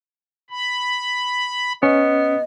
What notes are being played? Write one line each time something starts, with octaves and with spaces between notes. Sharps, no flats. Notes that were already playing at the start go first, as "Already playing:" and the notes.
B5
B3 C#4 D#5